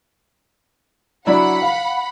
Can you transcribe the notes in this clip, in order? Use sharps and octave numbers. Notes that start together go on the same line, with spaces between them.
F#3 D4 E4 F#5 B5
F5